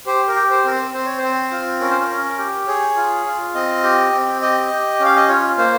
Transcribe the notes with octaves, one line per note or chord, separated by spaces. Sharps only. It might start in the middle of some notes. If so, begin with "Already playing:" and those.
G4 C5
A#4
G4
C5
C4 A#4
C5
C4 C5
C#5
C4 C5
F4
C#4 A#4
C5
A#4
C#4
G4
G#4 C#5
F4
F4
C4 D#5
G4
C4
G4 D#5
G4
C#4
F5
D#5
F4 C#5
A#3 C5